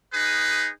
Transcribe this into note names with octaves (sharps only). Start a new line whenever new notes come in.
D#4 G#4 B4